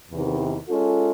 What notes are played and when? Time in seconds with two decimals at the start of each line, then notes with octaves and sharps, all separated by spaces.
0.11 E2 C3 D#3
0.68 G#3 C#4 F4 A4